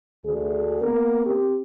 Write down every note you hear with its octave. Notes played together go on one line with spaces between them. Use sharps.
D2 G#4
A#3 B3 A#4
C4 G4